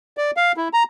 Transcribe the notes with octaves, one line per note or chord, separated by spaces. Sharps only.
D5
F5
E4
A#5